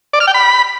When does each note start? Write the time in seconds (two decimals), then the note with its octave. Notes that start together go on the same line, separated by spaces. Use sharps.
0.13 D5
0.20 F6
0.27 G5
0.34 B5